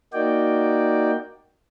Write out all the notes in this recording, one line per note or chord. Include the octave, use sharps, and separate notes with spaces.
A#3 D#4 F#4 D5 G5